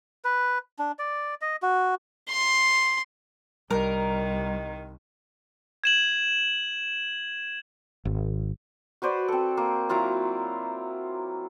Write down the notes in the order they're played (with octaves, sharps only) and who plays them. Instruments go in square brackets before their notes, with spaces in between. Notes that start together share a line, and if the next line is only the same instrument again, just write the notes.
[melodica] B4
D4
D5
D#5
F#4
[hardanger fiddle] C6
[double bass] C2 [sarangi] D#3 [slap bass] G3 [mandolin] A#4
[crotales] G#6 E7 F#7
[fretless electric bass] G#1
[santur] F#4 B4 C5 D5
C4 A4
A#3
F#3 E4 F4 A#5